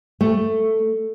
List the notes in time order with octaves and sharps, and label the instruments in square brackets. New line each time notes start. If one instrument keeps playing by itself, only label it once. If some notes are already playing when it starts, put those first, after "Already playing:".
[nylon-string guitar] A3